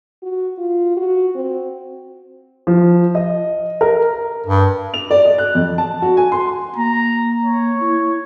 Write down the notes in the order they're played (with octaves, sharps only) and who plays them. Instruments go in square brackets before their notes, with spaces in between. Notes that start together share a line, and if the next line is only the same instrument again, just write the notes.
[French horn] F#4
F4
F#4
C4
[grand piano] F3
D#5
A#4
[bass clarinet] G2
[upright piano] F7
D5
D#5
F#6
F2
A5
F#4
G#5
C6
[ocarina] A#3 [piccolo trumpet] A#5
[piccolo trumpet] C#5
[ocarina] E4